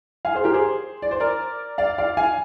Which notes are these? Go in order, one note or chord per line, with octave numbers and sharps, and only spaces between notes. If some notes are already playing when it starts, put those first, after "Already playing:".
F5 G#5
G#4 C5
G4 A#4
G#4 C5
D5
C5
A#4 D5
D5 F5
D5 F5
F5 G#5